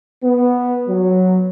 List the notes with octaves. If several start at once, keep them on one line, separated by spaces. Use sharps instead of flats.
B3
F#3